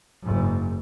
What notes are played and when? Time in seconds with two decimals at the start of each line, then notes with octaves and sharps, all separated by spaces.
0.24 F#1 G#2